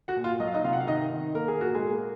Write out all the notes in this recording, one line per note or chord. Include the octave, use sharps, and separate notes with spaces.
F#4 F#5
A#2
F4 F5
F#3 D#5
F5
D#4 D#5
C3 F4 F5
F#5
F5
D#3 D#4 D#5
D#3
A#3 A#4
G#4
A#2 F#4
G#3 G#4
A#3